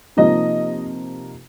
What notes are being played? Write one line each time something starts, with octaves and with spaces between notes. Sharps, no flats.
C3 F3 A#3 D#4 D#5